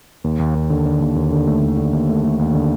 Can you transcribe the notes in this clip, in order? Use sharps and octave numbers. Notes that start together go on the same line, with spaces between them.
D#2
D#2
D#2
D3
D3
D#2
D#2
D3
A3
D#2
D3
D#2
A3
A3
D#2
D3